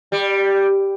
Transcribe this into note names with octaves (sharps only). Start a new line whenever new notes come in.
G3